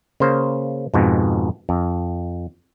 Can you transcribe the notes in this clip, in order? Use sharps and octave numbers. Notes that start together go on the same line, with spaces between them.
C#3 A#3 C5
F2 G#2 B2
F2